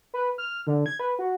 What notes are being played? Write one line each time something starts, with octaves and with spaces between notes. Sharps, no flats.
B4
F6
D3
G#6
B4
F#4